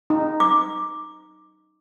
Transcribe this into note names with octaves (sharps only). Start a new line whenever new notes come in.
D#4
D6